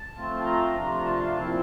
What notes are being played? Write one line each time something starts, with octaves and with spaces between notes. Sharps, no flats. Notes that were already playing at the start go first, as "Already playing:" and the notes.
Already playing: A5
F3 A3 C4 F4
A#5
C3 F3 A3 D4 F4
A#5
A5
F5
A#2 F3 C4 E4 A5